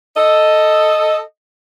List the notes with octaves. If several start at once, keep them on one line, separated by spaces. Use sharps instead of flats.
A4 D#5